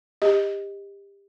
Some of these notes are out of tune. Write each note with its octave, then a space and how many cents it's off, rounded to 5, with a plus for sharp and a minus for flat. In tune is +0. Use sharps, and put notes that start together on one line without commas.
G4 +25 D#5 +0